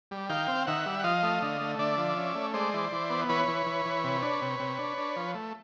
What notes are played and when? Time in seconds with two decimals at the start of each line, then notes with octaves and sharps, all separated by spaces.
0.11 G3
0.29 D#3 F5 G5
0.48 C4
0.67 D#3 E5 F#5
0.86 G3
0.99 F#5
1.04 F3 D#5 F5
1.23 A3
1.42 D3
1.61 A3
1.79 D3 D5 E5
1.98 F3
2.17 C#4
2.35 A3
2.54 G#3 C5 D5
2.74 E3
2.92 E3
3.10 B3
3.29 E3 B4 C#5
3.48 E3
3.66 E3
3.86 E3
4.04 C3
4.22 D4
4.42 C3
4.60 C3
4.79 D4
4.98 D4
5.16 F3
5.35 A3